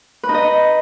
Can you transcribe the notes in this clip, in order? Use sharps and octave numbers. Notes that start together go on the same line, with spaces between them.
B4
D#4
D#5